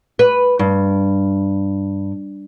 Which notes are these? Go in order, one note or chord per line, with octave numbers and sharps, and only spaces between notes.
B4
G2